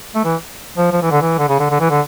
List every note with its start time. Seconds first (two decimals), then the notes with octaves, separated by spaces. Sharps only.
0.15 A3
0.24 E3
0.77 F3
0.92 F3
1.02 E3
1.11 D3
1.21 E3
1.38 D3
1.49 C#3
1.60 D3
1.70 D3
1.80 E3
1.90 D3